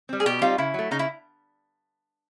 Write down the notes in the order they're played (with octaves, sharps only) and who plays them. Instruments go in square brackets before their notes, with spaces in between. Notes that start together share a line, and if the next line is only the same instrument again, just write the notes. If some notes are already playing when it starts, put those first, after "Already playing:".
[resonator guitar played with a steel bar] G3 C4
[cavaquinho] G#4
[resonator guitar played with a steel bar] B2 [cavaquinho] G4
[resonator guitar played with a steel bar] G3 C4 D#4 G4 [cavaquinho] F4
[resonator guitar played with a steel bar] C#3 [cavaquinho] E4
[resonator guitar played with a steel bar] F#3 A3
[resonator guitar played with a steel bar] C#3 [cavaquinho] D#4
[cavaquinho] E4